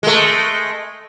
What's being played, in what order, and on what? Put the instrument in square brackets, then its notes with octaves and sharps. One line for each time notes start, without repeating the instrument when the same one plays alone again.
[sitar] G#3 A3